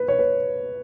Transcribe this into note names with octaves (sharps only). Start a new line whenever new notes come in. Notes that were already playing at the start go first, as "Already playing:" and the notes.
Already playing: B4
C#5
B4